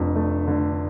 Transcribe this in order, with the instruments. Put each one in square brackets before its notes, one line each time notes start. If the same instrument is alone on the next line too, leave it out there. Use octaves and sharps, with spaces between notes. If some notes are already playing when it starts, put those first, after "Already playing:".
Already playing: [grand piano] F1 F2 [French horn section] D4
[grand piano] A3
D3